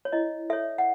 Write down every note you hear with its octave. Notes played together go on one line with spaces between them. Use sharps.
C#5
E4 D#5
A4 C#5 E5
F#5